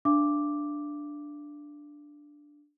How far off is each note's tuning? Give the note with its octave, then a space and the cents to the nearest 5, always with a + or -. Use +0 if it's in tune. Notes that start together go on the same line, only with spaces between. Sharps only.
D4 +0 F5 -45 D6 +0